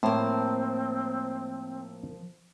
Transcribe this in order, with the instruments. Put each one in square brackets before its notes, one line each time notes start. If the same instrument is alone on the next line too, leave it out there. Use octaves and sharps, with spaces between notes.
[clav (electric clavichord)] A2 [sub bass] F3 [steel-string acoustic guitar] A#3 C5 [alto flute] C4